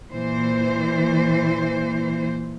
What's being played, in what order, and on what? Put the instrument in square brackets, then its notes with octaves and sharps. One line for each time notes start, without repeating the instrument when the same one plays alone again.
[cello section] A#2 E3 C5